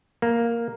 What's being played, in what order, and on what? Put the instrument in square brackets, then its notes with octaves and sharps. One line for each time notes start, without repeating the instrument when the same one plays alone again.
[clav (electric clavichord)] A#3